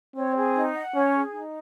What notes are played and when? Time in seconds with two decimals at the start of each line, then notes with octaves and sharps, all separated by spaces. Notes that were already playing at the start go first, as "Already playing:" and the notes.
0.16 C4 C#5
0.36 G#4
0.56 D#4
0.75 F#5
0.95 C#4 C#5
1.14 G#4
1.34 D#4